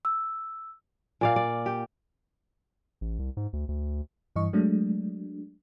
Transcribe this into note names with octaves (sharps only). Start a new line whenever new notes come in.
E6
A#2 D5 F5
D5
G4
A1
C2
G#2
D2
D2
G2 E3 D#5 C#6
F#3 G#3 A3 D4